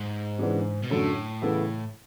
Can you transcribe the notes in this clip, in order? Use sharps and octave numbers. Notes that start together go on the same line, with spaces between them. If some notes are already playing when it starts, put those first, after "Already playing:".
Already playing: G#2
C#3 E3 G#3 B3 D4
B2
F#2 A2 D3 F#3 A3
C#3 E3 B3 E4 A4